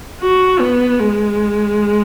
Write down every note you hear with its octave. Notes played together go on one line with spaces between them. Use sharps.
F#4
B3
G#3